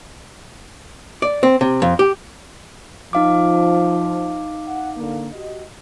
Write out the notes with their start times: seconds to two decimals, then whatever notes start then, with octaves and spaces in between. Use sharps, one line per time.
1.22 D5
1.43 C4
1.61 C3
1.82 F2
1.99 G4
3.13 F3 D#4 F5 D6
4.67 F#5
4.97 D3 A#3
5.33 F#4 G4 D#5